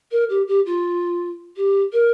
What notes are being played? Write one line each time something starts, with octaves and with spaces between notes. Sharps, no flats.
A#4
G4
G4
F4
G4
A#4